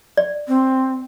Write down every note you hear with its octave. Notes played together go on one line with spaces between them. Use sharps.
D5
C4